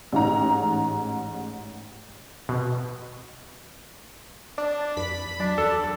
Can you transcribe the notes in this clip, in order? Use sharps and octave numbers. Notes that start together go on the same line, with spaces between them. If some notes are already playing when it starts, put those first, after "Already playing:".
A1 G#2 A#5
B2
D4
F2 B5
F#3 D4
E2 A4